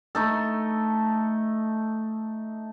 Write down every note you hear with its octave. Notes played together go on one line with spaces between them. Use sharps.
A3 D#4 A4